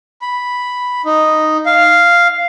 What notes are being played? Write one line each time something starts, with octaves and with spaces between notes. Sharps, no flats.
B5
D#4
F5